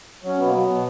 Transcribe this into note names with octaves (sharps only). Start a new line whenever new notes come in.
F#3 C#4
B2 B3
A#3
F#3 B3
B2